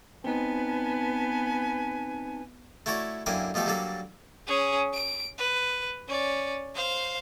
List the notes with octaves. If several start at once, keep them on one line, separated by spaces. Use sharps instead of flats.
B3 C4 D#4 B4 G#5 A5
A3 E4 F#4 C#5 D5
F#2 D3 A#3 E4 G5 G#5
B2 F3 A3 G4 A4
F#3 G3 A#3 D4 A4
C#4 G#4
D7
B4
C#4 D5
C5 F5